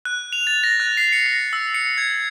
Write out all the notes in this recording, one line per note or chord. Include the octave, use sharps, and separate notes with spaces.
F#6
F7
A6
A#6
F#6
C7
C#7
A#6
E6
C#7
G#6